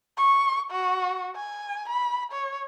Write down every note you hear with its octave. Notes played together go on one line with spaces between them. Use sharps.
C#6
F#4
G#5
B5
C#5